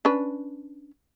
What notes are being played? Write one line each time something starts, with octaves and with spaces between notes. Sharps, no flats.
C#4 D4 B4